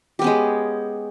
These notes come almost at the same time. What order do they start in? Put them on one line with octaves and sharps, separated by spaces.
G4 B3 C#4 G#3